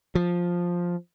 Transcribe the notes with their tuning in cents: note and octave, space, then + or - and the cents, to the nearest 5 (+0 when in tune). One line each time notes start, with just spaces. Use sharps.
F3 +5